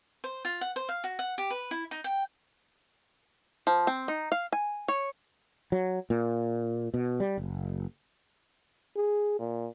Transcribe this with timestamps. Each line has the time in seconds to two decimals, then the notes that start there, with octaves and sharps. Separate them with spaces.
0.24 C5
0.45 F4
0.61 F#5
0.76 C5
0.89 F5
1.04 F#4
1.19 F#5
1.38 G4
1.50 B4
1.71 E4
1.91 D#4
2.04 G5
3.67 F3
3.87 C4
4.08 D#4
4.32 F5
4.52 G#5
4.88 C#5
5.72 F#3
6.10 A#2
6.94 B2
7.20 G3
7.37 F#1
8.96 G#4
9.39 A#2